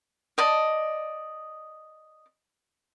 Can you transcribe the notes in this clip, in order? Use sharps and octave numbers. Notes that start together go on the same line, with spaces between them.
D5 D#5 A5